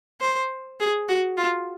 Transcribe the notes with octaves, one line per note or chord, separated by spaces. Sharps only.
C5
G#4
F#4
F4